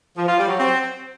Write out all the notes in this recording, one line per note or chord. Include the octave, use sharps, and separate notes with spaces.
F3
F4
G3
F#3
C4